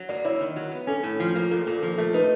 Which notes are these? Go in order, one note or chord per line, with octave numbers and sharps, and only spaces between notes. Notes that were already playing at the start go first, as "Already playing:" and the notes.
Already playing: F#3
A#3 D5
E4 C#5
D#3
F#3
B3
C#4 A4
A2
F3
A#3
A#2 A4
A#2 A4
F3 A4
A3 A#4
D#4 B4